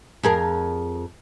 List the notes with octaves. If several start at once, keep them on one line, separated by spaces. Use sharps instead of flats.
F2 G#4 A#4